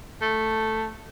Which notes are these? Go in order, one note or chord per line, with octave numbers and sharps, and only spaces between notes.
A3